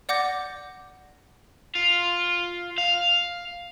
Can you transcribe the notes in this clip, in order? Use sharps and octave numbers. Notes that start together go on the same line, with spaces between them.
D5 F#5 D6 G6 A#6
F4
F5